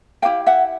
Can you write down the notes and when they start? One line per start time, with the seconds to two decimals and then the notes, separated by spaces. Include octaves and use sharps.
0.22 E4 G4 B4 F5 G5
0.46 E5 F#5